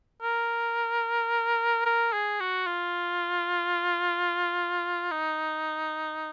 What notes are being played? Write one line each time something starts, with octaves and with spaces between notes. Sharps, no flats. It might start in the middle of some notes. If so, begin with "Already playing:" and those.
A#4
A#4
G#4
F#4
F4
D#4